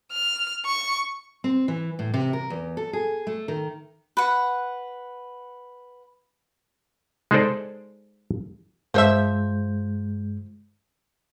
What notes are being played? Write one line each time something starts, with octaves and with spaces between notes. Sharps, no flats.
F6
C#6
C4
E3
A2
C3
A#4
E2
A4
G#4
A3
D#3
B4 F#5
G#3 D#4 G#4 A4 C5 D5
G2 F3 G#3 C5 E5 G6